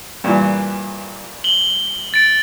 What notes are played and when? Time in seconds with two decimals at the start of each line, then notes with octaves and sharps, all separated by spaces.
0.24 G2 A#2 E3
1.44 F#7 G7
2.14 A6 D7